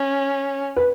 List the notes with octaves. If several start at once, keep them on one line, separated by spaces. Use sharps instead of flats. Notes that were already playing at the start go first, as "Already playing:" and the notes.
Already playing: C#4
B4